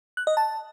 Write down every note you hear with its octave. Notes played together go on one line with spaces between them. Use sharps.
F#6
D#5
A5